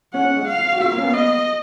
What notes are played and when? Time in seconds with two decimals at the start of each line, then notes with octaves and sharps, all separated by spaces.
0.13 C#4 F#5
0.24 C#4
0.36 G#3
0.48 F5
0.72 F#4
0.80 F4 F5
0.92 A#3
0.98 C#4
1.02 B3
1.14 D#5